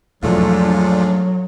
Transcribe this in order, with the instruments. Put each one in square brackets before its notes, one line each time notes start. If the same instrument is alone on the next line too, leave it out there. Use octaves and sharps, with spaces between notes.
[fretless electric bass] E2 B2 F3 [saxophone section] G#2 A3 [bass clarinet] F#3 [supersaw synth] D4 F4